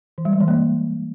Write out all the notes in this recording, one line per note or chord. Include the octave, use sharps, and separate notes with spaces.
E3
G3
G#3
E3
A#3